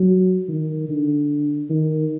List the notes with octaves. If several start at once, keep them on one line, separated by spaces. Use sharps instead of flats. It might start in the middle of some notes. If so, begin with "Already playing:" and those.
Already playing: F#3
D#3
D3
D#3